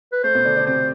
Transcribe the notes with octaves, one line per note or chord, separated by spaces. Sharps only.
B4
A3 C5
B2 B3
D3 D4
D3 D4
C3 C4 C5